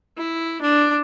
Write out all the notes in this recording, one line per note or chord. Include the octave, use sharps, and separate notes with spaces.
E4
D4